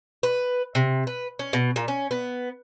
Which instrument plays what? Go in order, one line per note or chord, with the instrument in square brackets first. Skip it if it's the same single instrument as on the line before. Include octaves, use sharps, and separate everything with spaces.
[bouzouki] B4
C3
B4
C#4
B2
A#2
C#4
B3